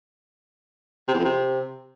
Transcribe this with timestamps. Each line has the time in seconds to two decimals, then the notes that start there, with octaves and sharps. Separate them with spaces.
1.08 C3
1.14 E2
1.19 F2
1.24 C3